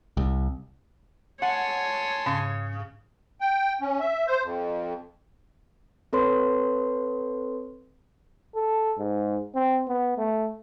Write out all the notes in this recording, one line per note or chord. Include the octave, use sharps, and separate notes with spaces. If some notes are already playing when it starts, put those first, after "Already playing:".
C2
C#5 F#5 G#5 A5 C6
G#2 C#3
G5
C#4
E5
C5
F2
C4 A4 B4 C#5 C6
A4
G#2
C4
B3
A3